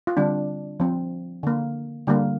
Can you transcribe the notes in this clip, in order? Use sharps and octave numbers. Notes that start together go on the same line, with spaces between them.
F4
D3 G3 C4 D4
F3 C4
D3 A#3
D3 G3 A#3